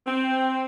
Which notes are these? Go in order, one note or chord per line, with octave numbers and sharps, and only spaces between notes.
C4